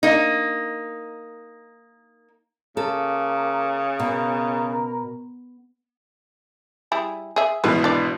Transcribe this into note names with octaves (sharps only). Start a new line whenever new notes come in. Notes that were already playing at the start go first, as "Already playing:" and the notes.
A#3 D#4
C#3 A#3 A4
B2 A#4
G3 E4 G#4
G#4 E5
G#1 B2 E3 B4
D4 D5